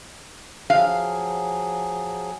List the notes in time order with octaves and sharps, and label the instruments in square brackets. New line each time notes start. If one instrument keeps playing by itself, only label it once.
[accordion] F3 F#3 G#4 [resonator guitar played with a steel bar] F5